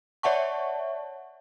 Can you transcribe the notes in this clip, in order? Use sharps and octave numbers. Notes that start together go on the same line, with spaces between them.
C#5 D5 E5 F#5 A5 C#6